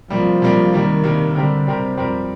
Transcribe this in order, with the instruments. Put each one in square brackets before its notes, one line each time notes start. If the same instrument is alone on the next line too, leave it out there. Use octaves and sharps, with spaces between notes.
[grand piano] C3 G3 A#3 [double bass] F3
[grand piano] C3 G3 A#3
[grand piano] C3 G3 A#3 [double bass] D#3
[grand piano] C3 G3 A#3
[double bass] D3 [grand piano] G3 C4 G4 A#4
[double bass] C3 [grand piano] G3 C4 G4 A#4
[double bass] F2 [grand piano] G3 C4 G4 A#4